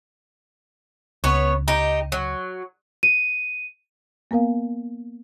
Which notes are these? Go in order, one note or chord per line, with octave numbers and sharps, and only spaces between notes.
C#2 B3 C#5
D#4 G4
F#3
D#7
A#3 B3 A#4 F5